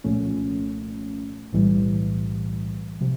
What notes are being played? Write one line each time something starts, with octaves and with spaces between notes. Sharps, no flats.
C2 A#2 F3 A3 C#4
B1 A2 E3 G3
C3 F3